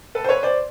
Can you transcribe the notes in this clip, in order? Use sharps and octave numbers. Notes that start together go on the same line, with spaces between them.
A4 B4
C5
B4 C#5
C5 D5